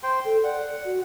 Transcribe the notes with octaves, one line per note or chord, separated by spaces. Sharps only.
C5 G5 C6
A4 G5
D5 F#5
F#4